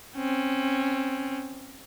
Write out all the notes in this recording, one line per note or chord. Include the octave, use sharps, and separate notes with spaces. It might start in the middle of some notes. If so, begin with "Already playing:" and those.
C4 C#4